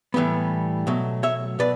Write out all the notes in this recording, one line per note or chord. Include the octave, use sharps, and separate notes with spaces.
A2 E3 G3 B3
B2 F#3 A3
C#5 E5
B2 B4 D5